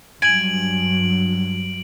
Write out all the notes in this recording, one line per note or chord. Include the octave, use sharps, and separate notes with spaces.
G2 F#3 G#5 D7 F#7